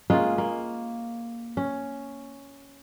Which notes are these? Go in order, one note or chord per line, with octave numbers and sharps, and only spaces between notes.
G#3 A#3 C#4 F4
A#3
C#4